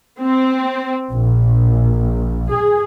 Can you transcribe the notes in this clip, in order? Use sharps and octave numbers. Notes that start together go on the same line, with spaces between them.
C4
A#1
G#4